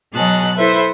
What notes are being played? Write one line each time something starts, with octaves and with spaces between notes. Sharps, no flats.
B2 F#3 G#4 D#5 A5 F#6
E4 A4 B4 C5 E5